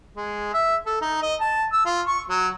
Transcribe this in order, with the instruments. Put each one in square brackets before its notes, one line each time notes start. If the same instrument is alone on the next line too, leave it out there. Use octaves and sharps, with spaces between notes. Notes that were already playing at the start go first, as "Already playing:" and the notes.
[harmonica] G#3
E5
A4
D#4
D#5
A5
E6
F4
C#6
F#3